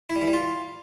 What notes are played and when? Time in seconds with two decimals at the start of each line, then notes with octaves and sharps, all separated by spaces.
0.10 E4
0.16 G3
0.21 E3
0.27 G3
0.33 F4